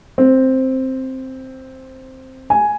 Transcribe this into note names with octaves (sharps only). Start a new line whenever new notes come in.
C4
G#5